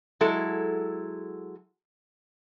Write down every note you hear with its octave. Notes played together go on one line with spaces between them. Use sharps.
F#3 G#3 E4 A4